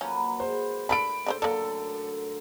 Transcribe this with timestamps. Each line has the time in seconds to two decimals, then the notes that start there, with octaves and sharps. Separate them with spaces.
0.01 F3 F#3 A#3 C#4 B4
0.40 G#3 C5
0.89 D4 G#4 A4 B5 D7
1.26 A2 D3 D4 A4 C5
1.42 F#2 D3 A#3 D4 A4